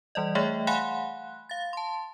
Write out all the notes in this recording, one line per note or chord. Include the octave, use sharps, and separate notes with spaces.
E3 G3 D5 D#5
A3 G#4 C#5 D#5 E5 G5
F5 F#5 G#5 B5 C6 F#6
F5 A6
A5 C6